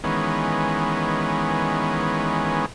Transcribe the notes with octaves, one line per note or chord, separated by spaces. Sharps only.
D#3 E3 G#3 B3 C#4